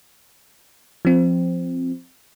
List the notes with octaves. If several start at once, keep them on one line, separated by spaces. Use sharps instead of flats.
F3 C4